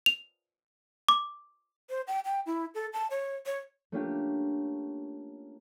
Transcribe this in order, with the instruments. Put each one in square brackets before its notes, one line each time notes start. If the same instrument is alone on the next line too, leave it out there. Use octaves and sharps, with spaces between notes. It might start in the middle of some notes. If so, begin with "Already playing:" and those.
[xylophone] F7
D6
[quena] C5
G5
G5
E4
A4
A5
C#5
C#5
[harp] A3 A#3 C#4 D4 F4 G4